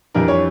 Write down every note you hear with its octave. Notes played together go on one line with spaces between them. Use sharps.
F2 E3 G3 D4 A#4
C#5